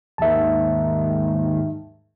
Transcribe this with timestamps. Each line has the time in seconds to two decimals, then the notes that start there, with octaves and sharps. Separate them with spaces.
0.18 D#2 G#2 D#3 E5 A5